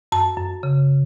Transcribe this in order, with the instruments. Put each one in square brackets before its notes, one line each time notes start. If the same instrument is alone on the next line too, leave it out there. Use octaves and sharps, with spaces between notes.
[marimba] F#2 A5
F#2
C#3